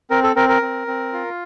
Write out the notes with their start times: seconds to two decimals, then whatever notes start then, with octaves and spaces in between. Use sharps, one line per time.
0.10 C4 A#4
0.23 A4
0.36 C4 A#4
0.49 A#4
0.62 C4
0.87 C4
1.13 F4